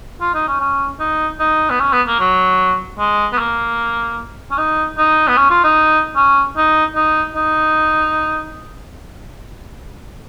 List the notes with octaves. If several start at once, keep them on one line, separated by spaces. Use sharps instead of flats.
F4
D#4
C#4
C#4
D#4
D#4
B3
C#4
B3
A#3
F#3
G#3
B3
A#3
C#4
D#4
D#4
B3
C#4
F4
D#4
C#4
D#4
D#4
D#4